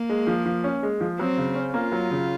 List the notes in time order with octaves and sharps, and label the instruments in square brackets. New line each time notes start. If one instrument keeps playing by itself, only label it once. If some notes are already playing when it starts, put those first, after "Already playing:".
Already playing: [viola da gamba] A#3
[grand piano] G#3
F3
F3
C#4
G#3
F3
[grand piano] F#3 [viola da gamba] C4
[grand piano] C#3
C#4
[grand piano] A#3 [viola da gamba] F4
[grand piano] F#3
C#3